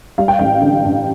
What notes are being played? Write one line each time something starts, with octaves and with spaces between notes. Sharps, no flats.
G3 F5
G5
A1 F5
D3
G2